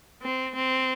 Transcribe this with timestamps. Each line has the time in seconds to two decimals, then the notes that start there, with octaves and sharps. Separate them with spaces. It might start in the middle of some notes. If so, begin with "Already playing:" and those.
0.22 C4
0.55 C4